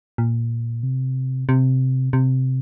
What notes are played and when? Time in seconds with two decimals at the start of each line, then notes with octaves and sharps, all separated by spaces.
0.18 A#2
0.83 C3
1.49 C3
2.13 C3